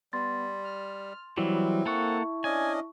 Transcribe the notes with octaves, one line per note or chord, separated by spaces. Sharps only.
G3 B3 C6 A6
F6
E3 F#3 G3 C4 E4
A#3 A4 F#5 A5 C#6
C#4 D4 D#5 G#5